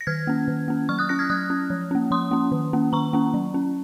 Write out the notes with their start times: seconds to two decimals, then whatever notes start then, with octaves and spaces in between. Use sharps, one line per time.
0.01 A#6
0.07 D#3 F6 G#6
0.27 A#3 C#4
0.48 D#3
0.68 A#3 C#4
0.89 F#3 C#6 F6
0.99 D#6 F#6
1.09 C#4 F#6 A#6
1.19 F6 G#6
1.30 F#3 D#6 F#6
1.50 C#4
1.70 F3
1.91 A#3 C#4
2.11 F3 C6 D#6
2.31 A#3 C#4
2.52 D#3
2.73 A#3 C#4
2.93 D#3 A#5 C#6
3.13 A#3 C#4
3.34 F#3
3.54 C#4